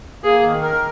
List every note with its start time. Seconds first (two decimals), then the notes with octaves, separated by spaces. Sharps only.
0.24 A#3 G#4
0.43 D#3
0.62 A#4